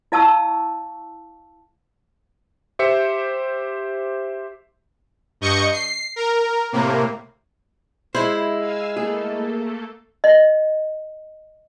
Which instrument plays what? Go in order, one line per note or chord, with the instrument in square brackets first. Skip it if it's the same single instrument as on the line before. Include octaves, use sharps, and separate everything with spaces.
[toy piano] E4 D#5 F5 A5 C#6 E6
[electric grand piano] G4 C5 E5 C#7
[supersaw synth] G2 D#5 C#6 G6 C#7
C7
A#4
A2 C3 A#3
[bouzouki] G#3 E4 [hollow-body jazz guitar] C5
[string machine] F5 G#5 E6
[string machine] A3 A#3 A4 [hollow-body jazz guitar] G#4
[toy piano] D#5